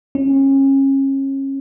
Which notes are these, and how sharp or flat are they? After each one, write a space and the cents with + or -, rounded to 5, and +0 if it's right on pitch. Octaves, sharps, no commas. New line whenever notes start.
C#4 -30